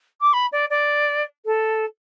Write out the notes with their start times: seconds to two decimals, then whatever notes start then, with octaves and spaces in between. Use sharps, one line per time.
0.21 D6
0.33 B5
0.52 D5
0.70 D5
1.46 A4